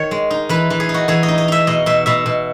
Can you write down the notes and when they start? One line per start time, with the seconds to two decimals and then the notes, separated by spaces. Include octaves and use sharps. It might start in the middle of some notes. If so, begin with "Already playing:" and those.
Already playing: D#3 C#5
0.11 G#3
0.31 D#4
0.49 E3 B4
0.70 E3
0.80 G#4
0.89 D#4
0.94 F#4
1.08 E3 G#4
1.23 D#5
1.29 D#4
1.38 D#5
1.48 D#4 E5
1.67 B2 D#5
1.86 B2 E5
2.06 B2 E5
2.26 B2